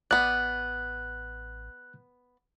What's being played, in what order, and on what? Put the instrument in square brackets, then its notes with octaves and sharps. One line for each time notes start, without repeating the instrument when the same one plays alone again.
[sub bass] A1 [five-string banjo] B3 D5 [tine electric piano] F#6